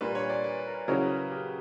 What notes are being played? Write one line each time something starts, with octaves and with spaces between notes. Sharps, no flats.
A#2 G3 A#3 D4 B4
C#5
D5
B4
A#4
C#3 F#3 C#4 E4 A#4
B4
B4
G4